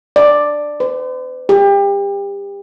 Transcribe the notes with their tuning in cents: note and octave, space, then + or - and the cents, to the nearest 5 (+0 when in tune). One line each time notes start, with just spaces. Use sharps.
D5 +5
C5 -45
G4 +30